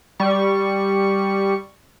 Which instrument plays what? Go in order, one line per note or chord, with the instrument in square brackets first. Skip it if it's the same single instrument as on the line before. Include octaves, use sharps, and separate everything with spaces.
[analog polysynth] G3 C#6